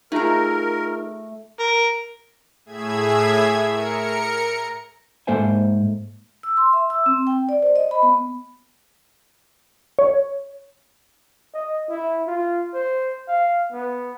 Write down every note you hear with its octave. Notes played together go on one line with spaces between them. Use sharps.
A3 D#4 F4 G#4 A#4 A#5
A#4
A2 G#4 E5 G#6
A#4 C#7
G#2 A#3 A4 C5 E5 G#5
E6
C6
E5
E6
C4
G5
D5
C5
D#5
B5
B3
C#5
D#5
E4
F4
C5
F5
B3